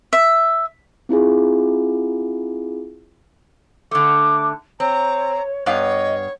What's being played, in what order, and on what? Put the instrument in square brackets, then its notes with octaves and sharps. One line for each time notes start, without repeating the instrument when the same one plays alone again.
[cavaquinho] E5
[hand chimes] C4 E4 F4 G#4
[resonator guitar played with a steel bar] D3 A3 [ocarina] D6
[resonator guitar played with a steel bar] C4 [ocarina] C#5 [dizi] A#5
[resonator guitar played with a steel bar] G2 B3 F5 [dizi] C#5 [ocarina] D#5